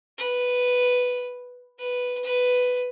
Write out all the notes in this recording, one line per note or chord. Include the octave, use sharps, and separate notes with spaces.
B4
B4
B4